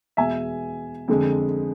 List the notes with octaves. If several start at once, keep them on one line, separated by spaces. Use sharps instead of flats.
E2 B2 G#3 E5 G#5
F2 D3 G#3